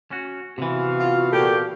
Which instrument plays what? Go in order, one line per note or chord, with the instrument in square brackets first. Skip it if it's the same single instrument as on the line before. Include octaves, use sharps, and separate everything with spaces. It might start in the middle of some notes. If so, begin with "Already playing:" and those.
[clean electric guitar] C#4 F#4
[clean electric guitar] C3 E3 [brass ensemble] B3 F#4 F5
[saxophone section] F4
A#2 A3 G4